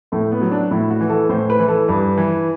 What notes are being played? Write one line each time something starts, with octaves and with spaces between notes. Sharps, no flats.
A2 A3
B3
F#3
D4
A2 E4
F#4
E3
A4
A2 C5
B4
E3
A4
G2 B4
E3